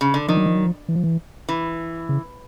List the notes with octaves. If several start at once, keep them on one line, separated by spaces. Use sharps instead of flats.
C#3
D3
D#3 F3
F#3
F3
F#3
F3
E3
F3
E3
E3
C#3